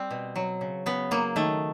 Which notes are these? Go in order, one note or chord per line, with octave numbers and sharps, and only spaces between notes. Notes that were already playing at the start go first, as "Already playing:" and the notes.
Already playing: G3 C4
B2
F#3
C#3
C#3 B3
F#3 A#3
D#3 A3